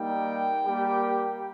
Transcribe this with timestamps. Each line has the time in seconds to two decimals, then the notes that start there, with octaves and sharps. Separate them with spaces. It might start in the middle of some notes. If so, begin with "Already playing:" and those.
Already playing: G3 A#3 D#4 G5
0.65 G3 A#3 G4